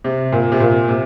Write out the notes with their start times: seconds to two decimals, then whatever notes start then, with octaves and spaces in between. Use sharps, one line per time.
0.04 C3
0.32 A#2
0.52 C3
0.60 A#2
0.89 C3